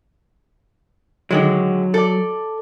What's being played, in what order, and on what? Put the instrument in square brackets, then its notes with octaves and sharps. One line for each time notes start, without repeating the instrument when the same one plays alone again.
[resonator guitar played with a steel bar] D3 D#3 G#3 [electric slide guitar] F#3
[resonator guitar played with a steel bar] A4 D5